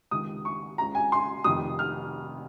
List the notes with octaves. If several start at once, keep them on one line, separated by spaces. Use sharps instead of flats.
C#2 C3 D#3 D#6
C#6
C#2 C#3 A#5
G#5
C6
F1 F2 C3 D#3 D#6
F6